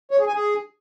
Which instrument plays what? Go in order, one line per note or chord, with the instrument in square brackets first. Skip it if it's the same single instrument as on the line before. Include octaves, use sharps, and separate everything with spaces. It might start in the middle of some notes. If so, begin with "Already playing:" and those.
[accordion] C#5
G#4
G#5
G#4